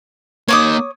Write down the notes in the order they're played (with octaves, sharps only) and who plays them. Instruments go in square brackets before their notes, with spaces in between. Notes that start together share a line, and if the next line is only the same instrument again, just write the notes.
[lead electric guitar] A#3 D#4 [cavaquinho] C#5 D6 D#6